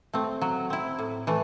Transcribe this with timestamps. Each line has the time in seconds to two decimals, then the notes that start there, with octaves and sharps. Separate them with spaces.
0.13 A3 C4
0.42 F#3
0.70 C4 E4
0.99 A2
1.27 E3 A3